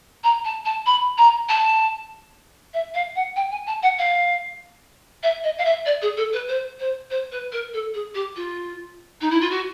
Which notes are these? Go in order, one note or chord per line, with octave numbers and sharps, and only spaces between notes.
A#5
A5
A5
B5
A#5
A5
E5
F5
F#5
G5
G#5
A5
F#5
F5
E5
D#5
F5
E5
D5
G#4
A4
B4
C5
C5
C5
B4
A#4
A4
G#4
G4
F4
D#4
E4
F4
F#4